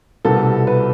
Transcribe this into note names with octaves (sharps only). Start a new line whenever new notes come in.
C2 B2 G3 B3 A4
B4